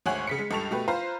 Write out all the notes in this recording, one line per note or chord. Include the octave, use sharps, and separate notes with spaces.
G#1 D2 C#5 F#5 G#5 F#7
C#3 B6 C#7
G#3
C#2 G2 A4 C#6 F7
B2 A3 G4 B4
F4 B4 C5 F5 A#5